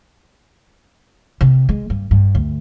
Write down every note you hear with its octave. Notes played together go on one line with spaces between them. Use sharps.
C3
G#3
G2
G2
D2